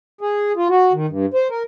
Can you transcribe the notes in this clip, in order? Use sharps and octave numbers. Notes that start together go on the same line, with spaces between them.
G#4
F4
F#4
D#3
G2
C5
A#4